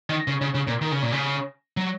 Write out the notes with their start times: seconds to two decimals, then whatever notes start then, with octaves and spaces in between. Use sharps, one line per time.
0.09 D#3
0.27 C#3
0.41 C#3
0.55 C#3
0.67 A#2
0.81 D#3
0.92 C#3
1.03 A#2
1.12 C#3
1.77 F#3